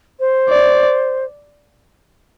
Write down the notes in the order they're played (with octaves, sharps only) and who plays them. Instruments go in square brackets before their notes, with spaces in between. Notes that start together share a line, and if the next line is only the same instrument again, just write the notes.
[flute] C5
[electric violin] D5